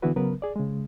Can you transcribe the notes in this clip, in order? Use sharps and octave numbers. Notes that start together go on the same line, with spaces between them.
D3 E3 B3 E4 F#4 B4
C#3 F#3 B3 A#4 B4
G#4 D5
C#3 G#3